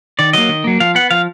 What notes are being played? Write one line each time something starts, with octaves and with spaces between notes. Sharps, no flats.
D#3 D5
F#3 A#3 D#5
D#3
F#3 A#3
F3 F5
B3 F#5
F3 F5